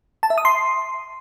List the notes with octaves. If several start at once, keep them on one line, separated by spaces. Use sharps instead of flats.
A5
E5
D#6
C6